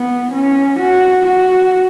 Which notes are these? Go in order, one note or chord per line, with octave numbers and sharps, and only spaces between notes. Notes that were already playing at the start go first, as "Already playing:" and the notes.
Already playing: B3
C#4
F#4
F#4